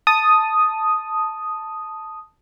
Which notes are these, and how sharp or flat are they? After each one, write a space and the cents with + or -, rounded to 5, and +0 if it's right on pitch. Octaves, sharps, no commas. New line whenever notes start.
A5 +0 D#6 +0